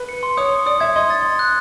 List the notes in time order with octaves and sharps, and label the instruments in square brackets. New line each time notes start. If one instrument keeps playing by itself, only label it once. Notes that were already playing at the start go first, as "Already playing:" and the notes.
Already playing: [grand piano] B4
[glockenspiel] C#7
C6
[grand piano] C#5 [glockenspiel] D#6
[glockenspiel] C6
[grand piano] D5 [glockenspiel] D#6
[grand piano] E5 [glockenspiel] G#6
[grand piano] D#5 [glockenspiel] C6
[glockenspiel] A6
C6
F#6